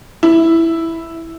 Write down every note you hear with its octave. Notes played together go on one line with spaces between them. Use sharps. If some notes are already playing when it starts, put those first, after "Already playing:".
E4